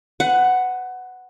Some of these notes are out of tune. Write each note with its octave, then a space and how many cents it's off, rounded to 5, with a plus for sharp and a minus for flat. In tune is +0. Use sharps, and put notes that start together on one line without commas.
B4 +30 F#5 +0